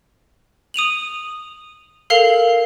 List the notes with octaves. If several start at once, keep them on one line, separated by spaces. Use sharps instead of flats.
D#6 D#7 F7 F#7
A4 A#4 F5 C7 F7